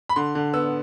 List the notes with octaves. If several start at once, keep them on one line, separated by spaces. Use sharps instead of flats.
B5
D3 C6
D3
B3 E6